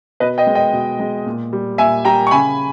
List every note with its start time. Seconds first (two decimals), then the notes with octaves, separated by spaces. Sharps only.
0.20 B2 B4 D#5
0.38 D#5 G5
0.47 G#3
0.55 D#5 G5
0.73 B2
1.00 G#3
1.26 A#2
1.53 G3
1.78 A#2 E5 G#5
2.05 G3 G5 A#5
2.27 C#6
2.31 C#3 G#5 B5